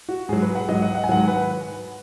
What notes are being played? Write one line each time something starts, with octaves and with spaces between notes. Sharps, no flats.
F#4
G#2 F#3 G#4
B4
F#5
G#2 F#3 D#5
F#5
F#5
G#5
G#2 D#3 F#3 F#5
B4